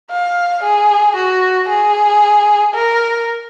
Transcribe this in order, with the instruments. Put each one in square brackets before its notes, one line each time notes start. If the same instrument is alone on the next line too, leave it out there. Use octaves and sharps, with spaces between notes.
[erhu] F5
G#4
F#4
G#4
A#4